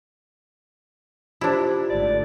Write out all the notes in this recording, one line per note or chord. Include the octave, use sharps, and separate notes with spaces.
D4 E4 F4 G4 C5
G#1 D3 A3 D5